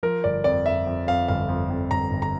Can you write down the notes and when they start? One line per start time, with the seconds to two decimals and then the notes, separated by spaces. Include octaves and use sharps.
0.03 F3 A#4
0.24 G1 D5
0.44 F2 D5
0.65 F2 E5
0.87 F2
1.07 F2 F5
1.28 G1 F5
1.49 F2
1.70 F2
1.91 G1 A#5
2.11 G1
2.22 A#5